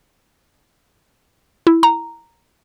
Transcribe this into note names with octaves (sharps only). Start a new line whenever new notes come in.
E4
A#5